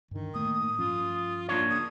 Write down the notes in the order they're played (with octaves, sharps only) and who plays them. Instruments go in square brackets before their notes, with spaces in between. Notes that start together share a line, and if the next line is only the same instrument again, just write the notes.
[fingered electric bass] G2 D3 [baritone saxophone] D#3
[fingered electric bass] A2 A3 A#3 [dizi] D#6
[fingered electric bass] G2 F3 C#4 [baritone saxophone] F4
[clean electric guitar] A#3 D4 C#5 [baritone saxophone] F4
[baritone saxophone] C#3 [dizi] D#6